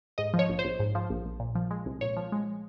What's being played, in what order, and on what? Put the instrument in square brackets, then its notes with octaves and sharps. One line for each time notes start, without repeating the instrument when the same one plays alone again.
[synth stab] G#2 D#5
F3
C#5
A#1
C5
A#1
G#2
F3
A#1
A#1
A#2
F3
G#3
C2
A#2 C#5
F3
G#3